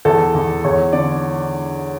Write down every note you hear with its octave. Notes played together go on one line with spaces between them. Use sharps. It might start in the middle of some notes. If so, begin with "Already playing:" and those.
E2 A4
E2
E2 C#5
D3 D5